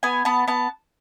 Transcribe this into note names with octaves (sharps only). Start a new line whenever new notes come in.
B3 G#5
B3 A5
B3 A5